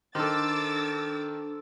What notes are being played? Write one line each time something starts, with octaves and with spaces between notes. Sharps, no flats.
D#3 D4 A4 C5 D6 E6 A6